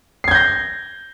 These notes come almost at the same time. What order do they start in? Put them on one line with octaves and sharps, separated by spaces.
C7 G#6 G6 A#6